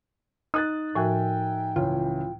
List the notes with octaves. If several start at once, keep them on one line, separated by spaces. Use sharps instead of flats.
D#4 D#6 F#6 A6
A2 F3 F#4 A#4 E5 G5 G#5
C#2 E3 C#4 F4